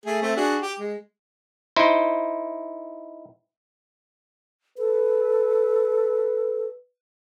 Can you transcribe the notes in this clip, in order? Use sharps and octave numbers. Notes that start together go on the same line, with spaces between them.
A3 G#4
A3 C4
D4 F#4 G#4
G4
G#3
D#4 E4 C5
A4 B4